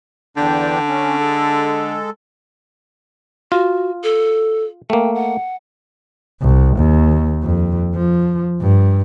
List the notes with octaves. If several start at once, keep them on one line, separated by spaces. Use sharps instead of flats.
E2 D3 D4 G5
C#4
G#3 A4
F4 F#4
A4
A3 A#3 G5
F#5
C2
D#2
F2
F3
G2